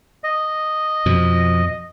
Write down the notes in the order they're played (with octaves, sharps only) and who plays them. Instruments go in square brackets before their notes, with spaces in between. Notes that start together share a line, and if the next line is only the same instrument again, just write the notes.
[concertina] D#5
[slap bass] F2 B2 F3